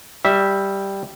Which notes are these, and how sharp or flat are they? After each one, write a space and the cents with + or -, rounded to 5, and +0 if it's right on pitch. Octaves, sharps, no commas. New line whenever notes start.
G3 +0 E5 -10